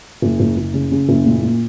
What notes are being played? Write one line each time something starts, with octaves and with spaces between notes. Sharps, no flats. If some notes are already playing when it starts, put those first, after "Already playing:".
F#1
F#1
F#1
C#3
C#3
F#1
A#2
A#2